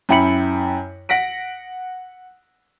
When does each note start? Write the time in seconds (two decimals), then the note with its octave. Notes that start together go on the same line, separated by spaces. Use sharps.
0.09 F#2 E4 G5 B5 C#7 F#7
1.09 F#5 A#6 B6 D7